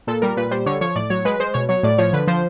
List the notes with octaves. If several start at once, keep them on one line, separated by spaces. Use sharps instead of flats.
A#2 A4
G3 A#4
A#2 B4
G3 C5
D3 C#5
F3 C#5
A2 D5
F#3 C#5
G#3 B4
G#3 C5
B2 C#5
F#3 C#5
A2 D5
F3 C#5
D3 B4
F3 C5